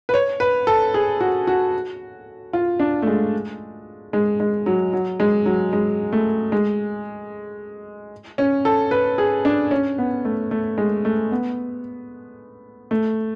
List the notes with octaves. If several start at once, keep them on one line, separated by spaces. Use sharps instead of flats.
B4
C#5
B4
A4
G#4
F#4
F#4
F4
D4
A3
G#3
G#3
G#3
F#3
F#3
G#3
F#3
G#3
A3
G#3
C#4
A4
B4
G#4
D4
C#4
B3
A3
A3
G#3
A3
B3
A3